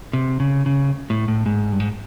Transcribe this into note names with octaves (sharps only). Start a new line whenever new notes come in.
C3
C#3
C#3
A2
A2
G#2
G2
G#2